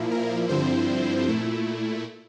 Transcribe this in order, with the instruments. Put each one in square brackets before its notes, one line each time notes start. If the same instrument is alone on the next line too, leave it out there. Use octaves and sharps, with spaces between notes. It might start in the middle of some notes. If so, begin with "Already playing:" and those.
Already playing: [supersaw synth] A#2 F3 A#3 E4
A#4
G2 D3 F3 C4 E4 C5
A#2 A3 E4